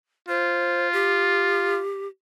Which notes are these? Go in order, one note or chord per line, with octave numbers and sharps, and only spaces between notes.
F4 C5
G4